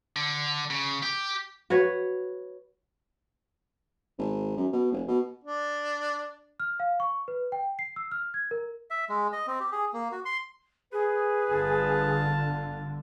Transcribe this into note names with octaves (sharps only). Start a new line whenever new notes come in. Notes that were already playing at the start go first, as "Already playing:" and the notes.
D3
C#3
G4
F#4 B4 C#5
G#1
F#2
B2
F1
B2
D4
F6
F5
C#6
B4
G5
C7
E6
F6
G#6
A#4
E5
G#3
D#5
C4
G4
G#4
A#3
F#4
C6
G#4 B4
G1 D3 F4 A5